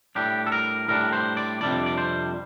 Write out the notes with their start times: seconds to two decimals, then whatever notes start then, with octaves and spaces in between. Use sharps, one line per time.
0.15 A2 G3 D4 G4
0.46 A4
0.52 A#4
0.88 A2 G3 D4 A#4
1.13 C5
1.37 D5
1.61 F2 C3 G3 D4 D5
1.86 D5
1.98 C5